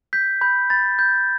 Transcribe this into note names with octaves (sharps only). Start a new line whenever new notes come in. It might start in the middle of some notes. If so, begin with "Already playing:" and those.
G6 B6
B5 G6
B5 A6
G6